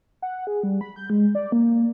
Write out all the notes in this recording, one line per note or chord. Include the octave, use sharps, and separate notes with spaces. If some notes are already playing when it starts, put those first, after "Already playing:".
F#5
G#4
G3
B5
G6
G#3
D5
A#3